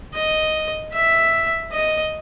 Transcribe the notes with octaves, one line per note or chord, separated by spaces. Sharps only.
D#5
E5
D#5